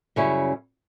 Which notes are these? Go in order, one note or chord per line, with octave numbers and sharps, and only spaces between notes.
F#2 C#3 G3 C#4 E4